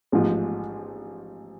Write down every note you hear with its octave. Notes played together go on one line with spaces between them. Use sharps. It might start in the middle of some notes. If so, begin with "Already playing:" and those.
A1 G#2 F3 G#3